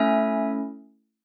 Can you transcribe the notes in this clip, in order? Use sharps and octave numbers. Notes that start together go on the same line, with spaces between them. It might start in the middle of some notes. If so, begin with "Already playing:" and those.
Already playing: A3 C#4 E4 E5 G#5